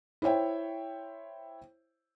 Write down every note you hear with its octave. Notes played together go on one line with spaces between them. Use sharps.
E4 C5 C#5 E5 G5